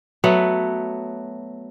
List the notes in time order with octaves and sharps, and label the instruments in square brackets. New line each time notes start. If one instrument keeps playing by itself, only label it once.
[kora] F#3 A3 B3